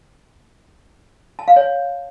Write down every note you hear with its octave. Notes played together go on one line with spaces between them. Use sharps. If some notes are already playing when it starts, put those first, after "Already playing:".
A5
F5
C#5